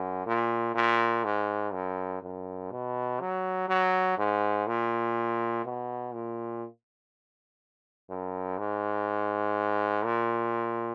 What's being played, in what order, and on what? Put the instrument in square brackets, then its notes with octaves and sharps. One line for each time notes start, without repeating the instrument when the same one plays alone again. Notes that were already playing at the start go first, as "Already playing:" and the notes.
Already playing: [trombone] F#2
A#2
A#2
G#2
F#2
F#2
B2
F#3
F#3
G#2
A#2
B2
A#2
F#2
G#2
A#2